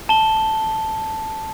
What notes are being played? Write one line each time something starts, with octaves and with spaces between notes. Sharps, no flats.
A5 G7